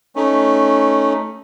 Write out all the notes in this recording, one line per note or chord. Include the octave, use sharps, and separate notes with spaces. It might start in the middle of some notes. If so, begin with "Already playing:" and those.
A3 C#4 D#4